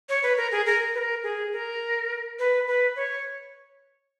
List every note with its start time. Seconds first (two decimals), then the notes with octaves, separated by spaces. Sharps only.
0.09 C#5
0.23 B4
0.37 A#4
0.52 G#4
0.66 A#4
0.95 B4
0.98 A#4
1.23 G#4
1.53 A#4
2.39 B4
2.67 B4
2.96 C#5